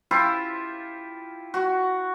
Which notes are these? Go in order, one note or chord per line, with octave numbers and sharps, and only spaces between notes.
E4 F4 G4
F#4